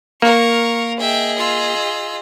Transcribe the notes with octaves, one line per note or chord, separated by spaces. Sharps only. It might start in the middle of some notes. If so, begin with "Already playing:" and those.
A#3 A#4 F5 C#6
G#4 D#5 E5 G5
F4 E6